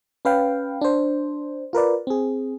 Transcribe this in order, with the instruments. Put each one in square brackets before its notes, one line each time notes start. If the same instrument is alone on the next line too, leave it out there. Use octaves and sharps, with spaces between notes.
[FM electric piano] C#4 B4 F5 G5
D4 C5
F4 A#4 B4 D5
C4 G#4